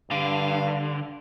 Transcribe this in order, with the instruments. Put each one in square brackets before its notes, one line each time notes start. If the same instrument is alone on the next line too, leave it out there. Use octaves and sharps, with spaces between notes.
[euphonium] G2 [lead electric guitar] D3 [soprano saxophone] F5